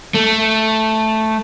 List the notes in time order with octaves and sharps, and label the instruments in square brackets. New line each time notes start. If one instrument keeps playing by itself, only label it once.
[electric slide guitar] A3